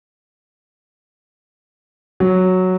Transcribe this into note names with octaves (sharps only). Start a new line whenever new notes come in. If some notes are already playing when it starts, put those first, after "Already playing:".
F#3